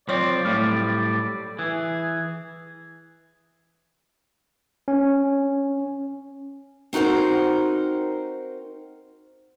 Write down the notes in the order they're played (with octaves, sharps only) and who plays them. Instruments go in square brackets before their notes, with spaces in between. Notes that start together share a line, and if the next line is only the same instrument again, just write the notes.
[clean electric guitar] F3 C4 [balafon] F#3 C#5 C#6 [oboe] D5
[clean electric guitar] A2 G3 [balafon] A3
[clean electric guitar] E3 [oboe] G#4
[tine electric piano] C#4
[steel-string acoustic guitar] C4 D#4 F#4 A#4 C5